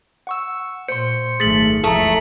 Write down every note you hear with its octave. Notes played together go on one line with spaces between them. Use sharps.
F#5 C#6 E6
A#2 C5 C6 C#7
G#1 F#2 A3 G#4 F6 A6 B6 F#7
F1 C#2 E3 A3 A#5 D#6